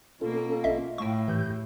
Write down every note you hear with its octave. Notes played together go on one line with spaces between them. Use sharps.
B2 A#3 C#4 F4 A4
A#1 D#5 E5
A2 F5 G5 C#6
G#2 E3 G4 G6